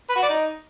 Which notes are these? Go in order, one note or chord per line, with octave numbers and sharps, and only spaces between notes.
B4
F#4
D5
D#4